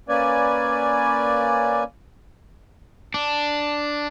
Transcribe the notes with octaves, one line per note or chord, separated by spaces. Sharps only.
A#3 C#4 B4 D5 G#5
D4